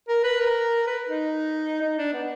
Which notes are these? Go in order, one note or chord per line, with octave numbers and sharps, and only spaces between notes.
A#4
B4
A#4
B4
D#4
D#4
D4
B3